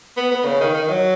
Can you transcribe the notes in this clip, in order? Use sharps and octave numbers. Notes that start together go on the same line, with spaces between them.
B3
B3
C#3
D#3
D#3
F#3